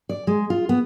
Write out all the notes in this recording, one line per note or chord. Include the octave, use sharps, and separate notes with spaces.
D5
G#3
F4
B3